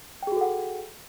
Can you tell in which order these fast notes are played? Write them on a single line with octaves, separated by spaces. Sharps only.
G5 G#4 F#4 A4 F#5